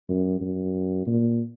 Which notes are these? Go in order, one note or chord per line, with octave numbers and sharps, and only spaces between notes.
F#2
F#2
A#2